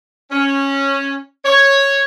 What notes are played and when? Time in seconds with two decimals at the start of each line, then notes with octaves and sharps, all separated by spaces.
0.32 C#4
1.45 C#5